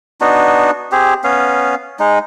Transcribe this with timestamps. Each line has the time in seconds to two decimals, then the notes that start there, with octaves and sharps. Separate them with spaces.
0.21 B3 D4 D#4 F#4
0.92 C4 G4 G#4
1.24 B3 C#4 F5
1.99 G#3 D#4